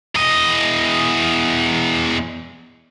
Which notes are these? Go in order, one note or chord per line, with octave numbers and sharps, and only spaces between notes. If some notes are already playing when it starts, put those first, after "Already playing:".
E2 D#5